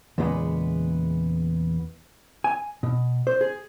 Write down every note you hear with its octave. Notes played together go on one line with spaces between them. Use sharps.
E2 A#2 C#3 G#3 B3
G#5
B2
C5
G#4